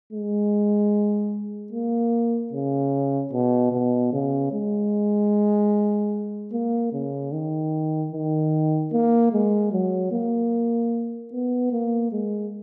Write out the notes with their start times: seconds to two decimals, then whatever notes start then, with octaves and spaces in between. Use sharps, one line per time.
0.13 G#3
1.73 A#3
2.53 C#3
3.33 B2
3.73 B2
4.13 C#3
4.53 G#3
6.53 A#3
6.93 C#3
7.32 D#3
8.12 D#3
8.92 A#3
9.32 G#3
9.72 F#3
10.12 A#3
11.33 B3
11.72 A#3
12.12 G#3